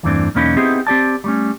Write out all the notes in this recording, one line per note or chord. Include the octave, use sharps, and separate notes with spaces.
E2 G2 E3 A3 C4 D4
B1 E2 A#3 C#4 D#4 B5
B3 C4 D#4 E4 G4 G#4
C4 G4 D5 A5
G3 A3 C#4